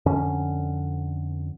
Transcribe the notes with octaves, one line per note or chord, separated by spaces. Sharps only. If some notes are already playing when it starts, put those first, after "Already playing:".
F2 D3 C#4